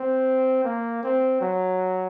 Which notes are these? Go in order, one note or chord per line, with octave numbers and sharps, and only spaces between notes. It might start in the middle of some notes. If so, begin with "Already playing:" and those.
Already playing: C4
A#3
C4
F#3